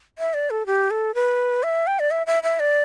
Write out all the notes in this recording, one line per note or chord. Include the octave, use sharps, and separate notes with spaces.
E5
D5
A4
G4
A4
B4
E5
G5
D5
E5
E5
E5
D5